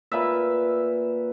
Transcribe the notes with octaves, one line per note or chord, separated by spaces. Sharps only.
A#2 B4 E5